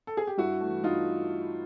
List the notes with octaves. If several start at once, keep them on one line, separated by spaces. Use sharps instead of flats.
A4
G#4
G4
G2 E4 F#4
E3 A3
G2 D#4 F4